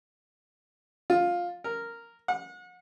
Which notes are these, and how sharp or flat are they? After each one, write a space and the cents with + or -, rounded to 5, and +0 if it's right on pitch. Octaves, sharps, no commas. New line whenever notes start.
F4 +10
A#4 -5
F#5 -35